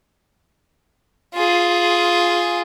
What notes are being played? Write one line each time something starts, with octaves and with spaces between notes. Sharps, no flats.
F4 G#4